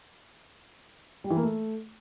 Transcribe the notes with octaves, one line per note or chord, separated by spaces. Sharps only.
G3
E3
A#3
A3